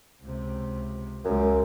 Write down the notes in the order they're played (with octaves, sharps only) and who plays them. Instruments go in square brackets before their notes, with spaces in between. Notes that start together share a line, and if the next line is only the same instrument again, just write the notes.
[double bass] C#2 C3
[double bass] C#2 G#3 [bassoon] F#2